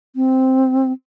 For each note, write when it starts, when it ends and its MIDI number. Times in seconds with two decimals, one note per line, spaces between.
0.16 0.92 60